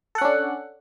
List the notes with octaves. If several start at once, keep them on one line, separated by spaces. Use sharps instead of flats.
C#4 D4 A4 F#5